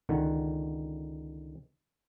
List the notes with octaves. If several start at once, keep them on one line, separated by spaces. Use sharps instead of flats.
C#2 D3 D#3 F#5